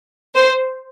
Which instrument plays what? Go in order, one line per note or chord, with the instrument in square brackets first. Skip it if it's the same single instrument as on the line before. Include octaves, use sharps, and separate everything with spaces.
[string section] C5